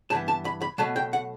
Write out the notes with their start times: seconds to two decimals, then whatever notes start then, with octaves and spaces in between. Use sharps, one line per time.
0.10 G2 E3 B3 A5
0.28 A5
0.45 B5
0.62 B5
0.78 B2 F#3 A3 A5
0.96 G5
1.13 F#5